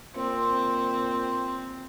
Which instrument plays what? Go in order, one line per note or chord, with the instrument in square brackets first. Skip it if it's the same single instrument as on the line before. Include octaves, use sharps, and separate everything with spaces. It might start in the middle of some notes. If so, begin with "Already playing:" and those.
[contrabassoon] A#2 [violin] C4